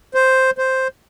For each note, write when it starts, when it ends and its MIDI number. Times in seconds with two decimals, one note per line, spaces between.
0.14 0.51 72
0.58 0.88 72